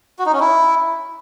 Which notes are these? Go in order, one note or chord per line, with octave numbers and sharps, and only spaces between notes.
F#4
D#4
C#4
E4